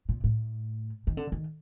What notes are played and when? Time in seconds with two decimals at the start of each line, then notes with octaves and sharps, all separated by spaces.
0.09 A#2
0.24 A2
1.07 D#3
1.17 D3
1.32 D#3